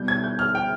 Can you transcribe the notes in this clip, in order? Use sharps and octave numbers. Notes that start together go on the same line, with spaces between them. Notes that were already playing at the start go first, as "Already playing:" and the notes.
Already playing: B2 G3 G6
G#6
G6
F6
G5